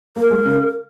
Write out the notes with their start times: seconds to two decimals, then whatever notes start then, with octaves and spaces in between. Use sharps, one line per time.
0.16 A#3 A#4
0.30 G#3
0.45 C#3